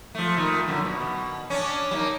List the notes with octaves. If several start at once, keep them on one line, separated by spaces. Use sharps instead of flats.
F3 A3
A#2 D#3 A3
F#2 D3 F3
B2
C#4 D4
G3 A#3 D#4